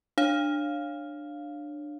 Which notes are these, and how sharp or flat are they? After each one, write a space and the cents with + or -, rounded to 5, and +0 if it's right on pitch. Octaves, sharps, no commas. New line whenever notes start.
D4 +15 C#5 +0 F5 +0